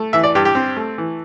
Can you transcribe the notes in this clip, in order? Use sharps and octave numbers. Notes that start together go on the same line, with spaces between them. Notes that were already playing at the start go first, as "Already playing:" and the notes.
Already playing: A3
E3 E5
D5
G2 G4
G4
C4
A3
E3